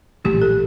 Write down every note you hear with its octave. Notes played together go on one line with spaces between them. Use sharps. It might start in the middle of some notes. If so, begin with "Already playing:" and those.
A#1 A2 E3 A3 G4
A4